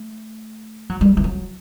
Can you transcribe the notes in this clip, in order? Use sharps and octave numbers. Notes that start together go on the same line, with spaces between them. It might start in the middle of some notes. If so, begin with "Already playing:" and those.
Already playing: A3
F#3
G3
E3
F#3